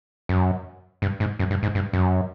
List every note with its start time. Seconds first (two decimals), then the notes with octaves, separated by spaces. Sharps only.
0.29 F#2
1.02 G2
1.20 G#2
1.39 F#2
1.50 G2
1.63 G#2
1.75 G2
1.93 F#2